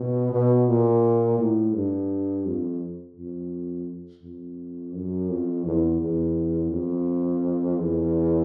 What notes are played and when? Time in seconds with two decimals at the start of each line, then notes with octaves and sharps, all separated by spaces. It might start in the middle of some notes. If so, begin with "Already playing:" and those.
Already playing: B2
0.32 B2
0.68 A#2
1.39 A2
1.75 G2
2.45 F2
3.16 F2
4.23 F2
4.94 F#2
5.29 F2
5.65 E2
6.01 E2
6.72 F2
7.79 E2